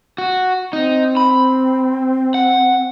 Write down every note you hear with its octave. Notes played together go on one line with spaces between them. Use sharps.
F#4
C4 D#4
B5
F#5